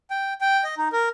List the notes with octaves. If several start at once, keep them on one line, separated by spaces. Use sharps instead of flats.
G5
G5
D#5
D#4
A#4